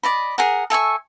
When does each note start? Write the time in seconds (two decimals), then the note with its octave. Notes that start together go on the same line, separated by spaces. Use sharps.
0.03 D5 D#5 B5
0.38 G#4 A#4 F#5
0.70 A4 E5 G#5 C#6